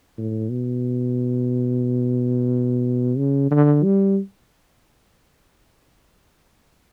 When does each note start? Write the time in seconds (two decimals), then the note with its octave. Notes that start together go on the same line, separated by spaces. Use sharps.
0.18 A2
0.51 B2
3.17 C#3
3.51 D3
3.84 G3